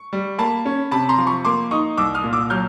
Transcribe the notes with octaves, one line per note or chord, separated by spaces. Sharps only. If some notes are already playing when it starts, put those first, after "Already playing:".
Already playing: C#6
G3
A#3 A5 B5
C#4
C3 A5 B5
A#5 C6
F3
B5 C#6
A#3 C6 D6
D#4 C#6 D#6
C2 D6 E6
D#6 F6
A#2
D6 E6
F#3 F6 G6